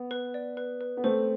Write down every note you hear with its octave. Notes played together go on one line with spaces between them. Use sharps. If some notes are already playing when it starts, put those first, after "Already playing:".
Already playing: B3
B4
D5
B4
B4
B3
A3 C4 C5